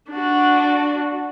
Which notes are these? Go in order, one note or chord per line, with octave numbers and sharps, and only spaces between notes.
D4 F#4